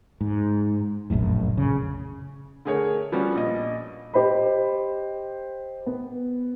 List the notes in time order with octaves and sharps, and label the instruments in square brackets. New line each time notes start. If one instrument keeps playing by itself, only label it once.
[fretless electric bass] G#2
F1 A#1 F#2 A2
C#3
[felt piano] D3 A3 G#4 A#4 C#5
F3 G3 B3 C#4 F#4
A#1 D#5
[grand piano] G4 C5 D#5 B5
B3